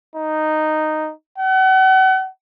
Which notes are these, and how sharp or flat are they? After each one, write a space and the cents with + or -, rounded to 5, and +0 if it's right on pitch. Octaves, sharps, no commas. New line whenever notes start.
D#4 -10
F#5 +35